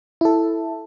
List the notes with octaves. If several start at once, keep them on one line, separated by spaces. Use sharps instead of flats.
E4 A4